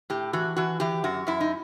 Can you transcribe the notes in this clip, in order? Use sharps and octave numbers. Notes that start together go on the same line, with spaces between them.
A2 G4
E3 F#4
E3 F#4
E3 G4
F#2 F#4
F#2 E4
D#4